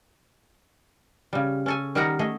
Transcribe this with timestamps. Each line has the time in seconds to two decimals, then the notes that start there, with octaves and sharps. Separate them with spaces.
1.33 C#3 G3
1.66 C#4 A4 G#5
1.95 D#3 G3 D#4 A#4 F#5 A#5
2.19 A3 G#4 D#5